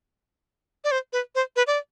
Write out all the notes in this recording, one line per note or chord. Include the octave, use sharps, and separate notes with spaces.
D5
C5
B4
C5
B4
D5